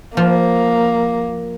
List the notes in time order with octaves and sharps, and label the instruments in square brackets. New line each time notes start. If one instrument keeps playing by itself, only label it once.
[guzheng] F3 [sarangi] A#3